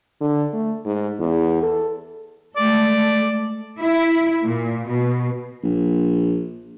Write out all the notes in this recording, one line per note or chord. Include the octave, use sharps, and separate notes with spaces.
D3
A3
G#2
E2
A4
G#3 A3 A4 D5
E4
A#2
B2
A#1